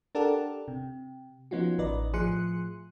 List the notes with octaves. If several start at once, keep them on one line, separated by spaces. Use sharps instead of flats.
D4 G4 A4 A#4 D5 F#5
C3
F3 B3 C#4 D#4 F4 F#4
A1 D#3 B4 D5 D#5
A2 F3 G#4 C6 F#6 C#7